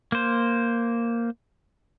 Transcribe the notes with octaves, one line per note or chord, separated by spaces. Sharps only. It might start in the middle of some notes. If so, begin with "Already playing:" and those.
A#3 C5